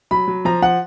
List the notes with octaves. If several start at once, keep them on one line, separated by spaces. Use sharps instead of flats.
F#3 B5
F#3
F3 A#5
F3 F#5